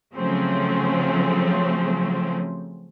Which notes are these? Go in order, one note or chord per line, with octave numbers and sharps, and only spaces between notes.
C#3 F3 F#3 A3 C4 C#4